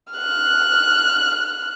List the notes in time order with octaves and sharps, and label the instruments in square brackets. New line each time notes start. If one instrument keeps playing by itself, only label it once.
[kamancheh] F6 F#6